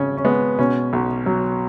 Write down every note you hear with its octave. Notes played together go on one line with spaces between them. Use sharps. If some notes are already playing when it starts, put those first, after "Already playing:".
Already playing: G#1 C#3 C#4
C#4
G#3 B3
B2 C#4
B1
F#3